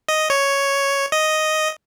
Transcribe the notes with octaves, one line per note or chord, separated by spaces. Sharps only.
D#5
C#5
D#5